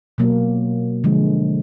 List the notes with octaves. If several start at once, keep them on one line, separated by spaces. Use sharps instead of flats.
B2 F#3 A#3
D3 F3 G#3